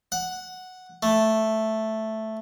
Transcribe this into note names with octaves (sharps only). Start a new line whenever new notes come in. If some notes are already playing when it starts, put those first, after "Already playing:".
F#5
A3